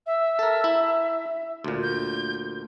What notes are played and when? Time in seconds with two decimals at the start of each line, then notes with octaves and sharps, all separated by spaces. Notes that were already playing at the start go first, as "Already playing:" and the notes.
0.06 E5
0.39 A4 A#4
0.64 E4
1.64 D2 A#2
1.82 G6